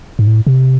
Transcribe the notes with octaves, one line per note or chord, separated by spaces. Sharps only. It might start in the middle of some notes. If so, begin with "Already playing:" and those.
G#2
A2
C3